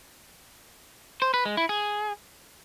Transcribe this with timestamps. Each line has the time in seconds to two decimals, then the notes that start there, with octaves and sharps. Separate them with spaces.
1.22 C5
1.34 B4
1.46 G#3
1.57 E4
1.69 G#4